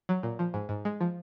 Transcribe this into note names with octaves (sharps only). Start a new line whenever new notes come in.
F#3
A#2
F3
G#2
G#2
G#3
F3